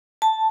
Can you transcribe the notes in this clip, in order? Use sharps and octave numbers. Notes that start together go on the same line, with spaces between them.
A5